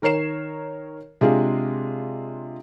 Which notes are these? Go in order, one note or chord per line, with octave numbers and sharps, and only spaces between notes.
D#3 A#4 C#5 C7 E7
C3 G#3 D4 F4 G#4